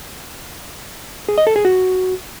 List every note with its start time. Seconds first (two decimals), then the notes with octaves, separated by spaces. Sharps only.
1.29 G#4
1.38 D#5
1.47 A4
1.56 G#4
1.65 F#4